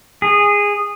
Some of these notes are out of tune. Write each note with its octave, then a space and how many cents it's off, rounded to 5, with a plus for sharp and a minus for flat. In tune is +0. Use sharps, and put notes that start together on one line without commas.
G#4 -15